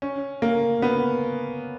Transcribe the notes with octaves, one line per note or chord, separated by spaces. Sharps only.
C#4
A#3
B3